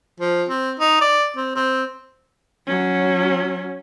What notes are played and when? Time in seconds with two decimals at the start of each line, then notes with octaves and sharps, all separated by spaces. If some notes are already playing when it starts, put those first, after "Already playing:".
0.20 F3
0.48 C4
0.80 D#4
1.01 D5
1.37 C4
1.55 C4
2.66 F#3 C#4